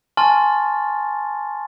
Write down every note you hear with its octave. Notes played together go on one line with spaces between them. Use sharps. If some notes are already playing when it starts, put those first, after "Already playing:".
G#5 A5 C6 C#6 F6 A6